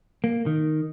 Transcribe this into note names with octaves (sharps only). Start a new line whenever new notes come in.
A#3
D#3